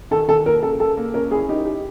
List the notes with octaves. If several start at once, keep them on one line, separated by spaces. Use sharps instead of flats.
D#3 A4
D#3 A4
A#3 A#4
C#3 A4
C#3 A4
A#3
C#4 A#4
E4 G#4
D#4 G4
G4